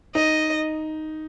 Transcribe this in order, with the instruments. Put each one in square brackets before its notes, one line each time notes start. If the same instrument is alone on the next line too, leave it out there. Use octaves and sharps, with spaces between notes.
[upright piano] D#4 [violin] D#5